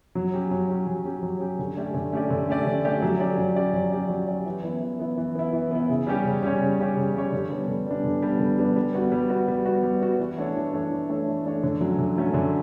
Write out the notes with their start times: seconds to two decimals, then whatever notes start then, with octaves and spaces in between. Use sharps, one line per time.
0.15 F#3
0.33 C#4 G4
0.51 F#3
0.69 C#4 G4
0.87 F#3
1.05 C#4 G4
1.23 F#3
1.40 C#4 G4
1.59 D3
1.77 A3 C#4 G4 D5
1.94 D3
2.12 A3 C#4 G4 D5
2.30 D3
2.48 A3 C#4 G4 D5
2.67 D3
2.85 A3 C#4 G4 D5
3.02 F#3
3.20 C#4 G4 D5
3.38 F#3
3.56 C#4 G4 D5
3.74 F#3
3.92 C#4 G4 D5
4.10 F#3
4.28 C#4 G4 D5
4.45 E3
4.64 B3 E4
4.82 E3
4.99 B3 E4
5.18 E3
5.35 B3 E4
5.53 E3
5.71 B3 E4
5.89 C#3
6.07 G3 C#4 G4 C#5
6.25 C#3
6.43 G3 C#4 G4 C#5
6.61 C#3
6.79 G3 C#4 G4 C#5
6.97 C#3
7.15 G3 C#4 G4 C#5
7.32 D3
7.50 G3 B3 D4
7.68 D3
7.86 G3 B3 D4
8.04 D3
8.22 G3 B3 D4
8.40 D3
8.58 G3 B3 D4
8.76 G3
8.94 B3 F#4
9.12 G3
9.30 B3 F#4
9.48 G3
9.66 B3 F#4
9.84 G3
10.01 B3 F#4
10.20 E3
10.38 A3 D4 A4 C#5
10.55 E3
10.73 A3 D4 A4 C#5
10.90 E3
11.09 A3 D4 A4 C#5
11.27 E3
11.45 A3 D4 A4 C#5
11.63 D3
11.81 F#3 A3 C#4
11.99 D3
12.17 F#3 A3 C#4
12.34 D3